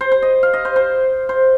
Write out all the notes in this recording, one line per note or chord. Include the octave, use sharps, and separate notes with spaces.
C5
C5
D#5
F5
D#5
C5
C5
C5